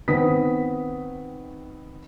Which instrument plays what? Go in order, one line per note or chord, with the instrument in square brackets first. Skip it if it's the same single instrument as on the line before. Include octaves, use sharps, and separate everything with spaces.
[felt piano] D#3 B3 C4 D#6 B6